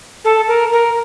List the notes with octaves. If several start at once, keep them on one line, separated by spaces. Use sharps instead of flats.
A4
A#4
A#4